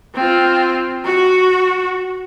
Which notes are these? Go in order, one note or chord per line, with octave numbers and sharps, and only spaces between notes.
C4 F4
F#4